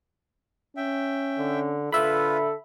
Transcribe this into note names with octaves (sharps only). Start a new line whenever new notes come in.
C#4 E5 G5
D3
D3 F4 A4 B4 E5 B5